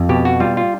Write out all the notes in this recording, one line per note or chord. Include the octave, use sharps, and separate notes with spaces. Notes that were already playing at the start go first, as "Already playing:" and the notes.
Already playing: F2
B2 G4
F#4
G3 F4
F4